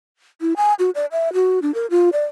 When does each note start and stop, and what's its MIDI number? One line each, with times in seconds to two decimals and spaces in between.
0.41 0.53 64
0.56 0.74 80
0.79 0.90 66
0.95 1.06 74
1.12 1.33 76
1.33 1.59 66
1.62 1.74 62
1.74 1.86 70
1.90 2.09 65
2.13 2.24 74